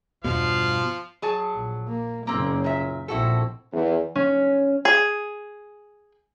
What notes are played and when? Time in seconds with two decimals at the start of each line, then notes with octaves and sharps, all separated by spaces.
0.24 E2 G2 B2 F3 F5
1.22 F#3 G#4 A5
1.54 A#1
1.88 A#3
2.27 F#1 C#3 A#3 C4
2.64 A#2 E5
3.08 A#1 C4 E4 F#4 A4
3.73 E2
4.15 C#4
4.85 G#4